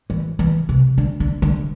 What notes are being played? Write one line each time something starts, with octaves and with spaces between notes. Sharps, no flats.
E3
E3
C3
D3
D3
D3